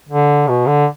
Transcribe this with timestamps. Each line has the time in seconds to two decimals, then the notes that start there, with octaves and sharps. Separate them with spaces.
0.09 D3
0.48 B2
0.66 D3